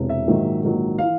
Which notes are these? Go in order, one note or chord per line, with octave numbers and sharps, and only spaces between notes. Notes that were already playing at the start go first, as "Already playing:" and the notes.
Already playing: E1 E2 C3
E5
A#1 G#2 D#3 F#3
A#1 G#2 D#3 F#3
E3 F5